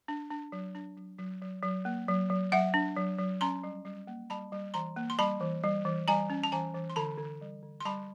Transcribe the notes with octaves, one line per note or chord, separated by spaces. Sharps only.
D4
D4
F#3
D4
F#3
F#3
F#3
F#3
A#3
F#3
F#3
F#3 E5 F#5
D4
F#3
F#3
C#4 A#5 C6
G3
G3
A#3
G3 A5 B5
G3
E3 A#5 C6
A#3
C6
G3 A5 B5
E3
G3
E3
G3 G#5 A#5
C#4
A5
E3 G#5 A#5
E3
C6
D3 A5 B5
D3
G3
D3
C6
G3 A5 B5